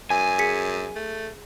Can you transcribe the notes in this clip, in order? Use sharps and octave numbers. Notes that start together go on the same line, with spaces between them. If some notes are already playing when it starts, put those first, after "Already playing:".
F#2 G#5
G#4 B6 C#7
A3